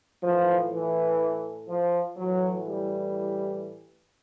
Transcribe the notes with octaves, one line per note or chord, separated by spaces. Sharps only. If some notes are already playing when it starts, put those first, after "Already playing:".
A2 E3 F3
E3
F3
A2 E3 F#3
G3